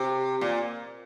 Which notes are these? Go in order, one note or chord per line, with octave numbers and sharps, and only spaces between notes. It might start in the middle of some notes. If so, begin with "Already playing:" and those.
Already playing: C3
A#2